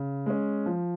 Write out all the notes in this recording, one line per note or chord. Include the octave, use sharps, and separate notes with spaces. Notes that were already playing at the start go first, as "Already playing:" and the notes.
Already playing: C#3
G#3 C#4
F3